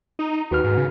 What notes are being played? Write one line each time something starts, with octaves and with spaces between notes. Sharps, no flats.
D#4
D#2 F#4 B4 F6
G#2
C#3